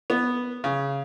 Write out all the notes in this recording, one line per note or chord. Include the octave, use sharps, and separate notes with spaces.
B3
C#3